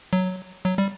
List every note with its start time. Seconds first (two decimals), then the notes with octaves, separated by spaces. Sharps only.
0.13 F#3
0.65 F#3
0.78 G3